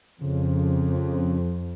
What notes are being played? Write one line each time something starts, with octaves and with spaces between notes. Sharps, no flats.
F2 C#3